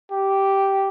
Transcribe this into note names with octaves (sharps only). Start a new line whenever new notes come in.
G4